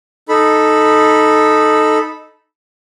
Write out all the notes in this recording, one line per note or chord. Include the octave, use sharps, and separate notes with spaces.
D#4 A4 B5